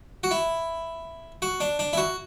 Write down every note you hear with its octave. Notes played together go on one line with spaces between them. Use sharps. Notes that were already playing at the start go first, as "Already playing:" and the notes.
F#4
E4
F#4
D4
D4
E4
F#4